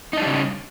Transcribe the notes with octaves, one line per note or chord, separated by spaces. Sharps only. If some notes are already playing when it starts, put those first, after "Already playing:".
C#3 G3 D4 D#4